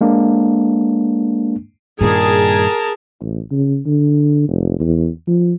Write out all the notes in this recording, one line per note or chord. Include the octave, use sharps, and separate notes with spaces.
G#3 A#3 D4
G2 A#2 D#3 G#4 A#4 A5
A1
C#3
D3
F1
E2
F3